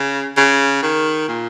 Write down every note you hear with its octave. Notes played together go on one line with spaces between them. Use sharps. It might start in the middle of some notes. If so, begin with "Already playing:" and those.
Already playing: C#3
C#3
D#3
A#2